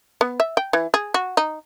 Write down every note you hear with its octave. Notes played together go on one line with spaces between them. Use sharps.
B3
E5
G5
E3
G#4
F#4
D#4